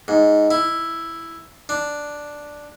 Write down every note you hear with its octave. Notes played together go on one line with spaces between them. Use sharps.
G#2
E4
D4